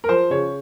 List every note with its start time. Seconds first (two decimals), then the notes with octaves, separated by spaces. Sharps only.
0.04 A#4
0.09 F3 C5
0.30 C#3 C#5